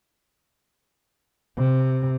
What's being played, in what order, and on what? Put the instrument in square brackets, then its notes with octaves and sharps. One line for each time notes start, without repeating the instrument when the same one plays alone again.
[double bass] C3